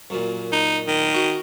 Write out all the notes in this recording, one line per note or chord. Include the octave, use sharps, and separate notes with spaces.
F#2 A#2
D#4
D#3
F#4